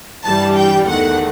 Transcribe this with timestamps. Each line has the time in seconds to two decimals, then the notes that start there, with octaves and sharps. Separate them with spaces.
0.24 G2 E3 G3 A5
0.56 G5
0.88 E2 D#3 A3 F#5